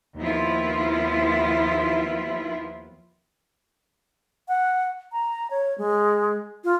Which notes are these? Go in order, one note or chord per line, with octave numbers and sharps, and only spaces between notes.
D#2 F3 B3 E4 F4
F#5
A#5
C#5
G#3
F4